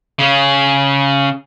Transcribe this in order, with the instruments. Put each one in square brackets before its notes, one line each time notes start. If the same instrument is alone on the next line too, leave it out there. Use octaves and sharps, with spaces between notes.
[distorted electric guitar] C#3 C#4